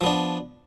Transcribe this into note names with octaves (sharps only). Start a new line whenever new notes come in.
F3 B3 D4